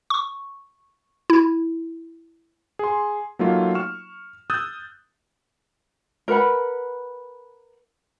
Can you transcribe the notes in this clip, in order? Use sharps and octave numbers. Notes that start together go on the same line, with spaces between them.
C#6
E4
G#4 C6
F#3 A3 A#3 D#4 F4
C#6 F6 E7
D#6 E6 F#6 G6 A6
A#4 B4 F#5 B5